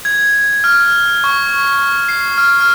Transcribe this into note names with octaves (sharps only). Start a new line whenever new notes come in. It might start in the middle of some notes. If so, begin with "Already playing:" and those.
G#6
F6
C#6
C7
F6
F6